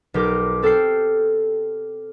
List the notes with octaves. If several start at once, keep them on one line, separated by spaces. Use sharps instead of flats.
B1 G4 A#4 D6
C4 A4 G5 F6 C7